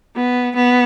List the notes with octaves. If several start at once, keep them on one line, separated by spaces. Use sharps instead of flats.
B3
B3